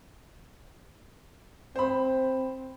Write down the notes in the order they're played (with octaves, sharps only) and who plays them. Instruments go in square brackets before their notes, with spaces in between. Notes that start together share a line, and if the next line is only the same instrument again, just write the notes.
[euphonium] C4 [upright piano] C5 B5